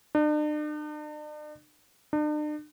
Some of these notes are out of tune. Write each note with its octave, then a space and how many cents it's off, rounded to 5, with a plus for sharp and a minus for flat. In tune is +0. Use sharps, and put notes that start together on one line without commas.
D4 +45
D4 +45